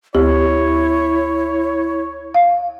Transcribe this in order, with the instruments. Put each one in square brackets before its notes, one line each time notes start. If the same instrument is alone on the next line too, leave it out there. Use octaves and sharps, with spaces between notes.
[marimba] D2 G4 [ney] E4 [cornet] C#5
[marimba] F5